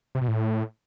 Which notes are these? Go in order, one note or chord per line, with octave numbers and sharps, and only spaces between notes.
C3
B2
A2